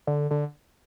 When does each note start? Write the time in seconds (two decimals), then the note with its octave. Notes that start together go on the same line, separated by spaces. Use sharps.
0.07 D3
0.31 D3